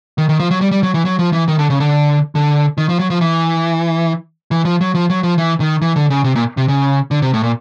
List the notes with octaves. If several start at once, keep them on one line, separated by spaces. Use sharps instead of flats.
D#3
D#3
F3
F#3
G3
G3
F#3
E3
F#3
F3
E3
D#3
D3
C#3
D3
D3
D#3
F3
F#3
F3
E3
E3
F3
F#3
F3
F#3
F3
E3
D#3
E3
D3
C#3
C3
A#2
C3
C#3
D3
C3
A2
A#2